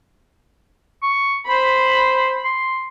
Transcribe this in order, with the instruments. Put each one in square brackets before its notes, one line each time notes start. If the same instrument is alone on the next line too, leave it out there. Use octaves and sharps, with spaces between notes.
[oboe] C#6
[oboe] C5 [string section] B5
[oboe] C6